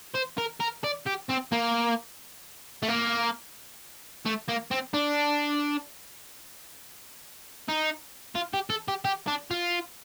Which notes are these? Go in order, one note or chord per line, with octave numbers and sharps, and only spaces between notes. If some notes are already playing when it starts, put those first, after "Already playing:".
C5
A#4
A#4
D5
G4
C4
A#3
A3
A#3
A3
A#3
C4
D4
D#4
F4
G4
A4
G4
G4
D4
F4